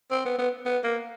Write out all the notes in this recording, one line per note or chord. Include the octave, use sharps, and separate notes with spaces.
C4
B3
B3
B3
A#3